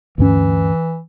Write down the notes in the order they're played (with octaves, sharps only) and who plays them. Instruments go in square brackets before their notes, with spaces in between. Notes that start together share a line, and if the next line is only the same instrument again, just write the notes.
[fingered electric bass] D2 G2 C#4 [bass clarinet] E3